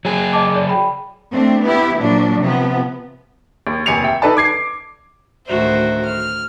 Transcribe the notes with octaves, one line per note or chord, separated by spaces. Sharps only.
F#3 G#4
D#5 A5 D6
D5
G5 B5
A3 C4 D4
B3 E4 G4
A#2 F3 F#3 D4
C3 F3 B3
D#2
F1 D#2 G#5 C#7 F7
E5 G5
D#4 A4 B4 D5 A5
D6 G#6 C7
D2 A2 D#3 F#4 C5 E5
F6